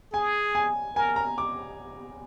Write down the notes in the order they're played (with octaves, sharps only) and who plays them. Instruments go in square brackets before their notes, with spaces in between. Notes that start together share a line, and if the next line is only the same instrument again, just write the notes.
[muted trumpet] G#4 [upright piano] G#5
[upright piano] G#5
[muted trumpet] A#4 [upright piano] G#5
[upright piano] A#5
D6